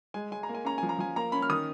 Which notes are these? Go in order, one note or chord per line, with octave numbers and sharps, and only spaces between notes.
G#3 G#5
G#3 G#5
A#5
A#3
G#5
C#4 A#5
F3 G#5
A#5
F3 G#5
A#3 A#5
C#4 B5
F6
D#3 D#6